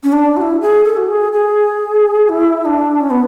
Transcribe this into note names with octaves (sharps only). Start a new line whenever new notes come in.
C#4
D4
F#4
E4
G#4
A4
F#4
G#4
G#4
E4
D4
C#4
B3